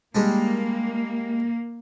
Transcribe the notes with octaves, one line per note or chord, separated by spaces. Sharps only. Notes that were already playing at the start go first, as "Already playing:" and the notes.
G3 G#3 A#3 D4